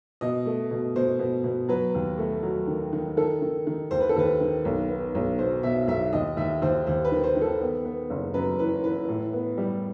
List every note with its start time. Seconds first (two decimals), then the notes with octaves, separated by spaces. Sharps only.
0.21 B2 D#5
0.46 A3
0.71 B2
0.96 B2 C5
1.19 B2
1.44 B2
1.69 F#3 B4
1.94 D#2
2.18 A3
2.43 F#3
2.67 D#3
2.93 D#3
3.17 D#3 A4
3.42 D#3
3.67 D#3
3.91 D#2 C5
4.00 B4
4.09 A4
4.16 D#2 B4
4.40 D#3
4.65 B1
4.89 B3
5.15 B1
5.39 B2 C5
5.63 B2 E5
5.88 B1 E5
6.13 D#2 D#5
6.37 D#2 E5
6.62 D#2 C5
6.87 D#2 C5
7.05 B4
7.12 D#3
7.24 C5
7.36 D#3
7.42 A4
7.61 B3
7.85 B3
8.10 F#1
8.34 F#2 B4
8.59 E3 B4
8.84 E3 B4
9.09 A2
9.33 B3
9.58 G3